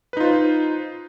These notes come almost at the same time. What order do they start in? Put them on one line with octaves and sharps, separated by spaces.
B4 D#4 F4 C5